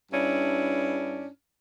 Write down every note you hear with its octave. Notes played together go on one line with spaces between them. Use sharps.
G2 C#4 D4 E4